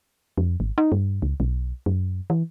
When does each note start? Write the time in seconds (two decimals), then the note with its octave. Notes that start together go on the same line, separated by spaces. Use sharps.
0.38 F2
0.60 G#1
0.78 D#4
0.92 G2
1.22 C#2
1.40 B1
1.86 F#2
2.30 E3